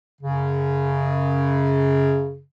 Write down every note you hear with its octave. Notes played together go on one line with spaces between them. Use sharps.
F#2 C#3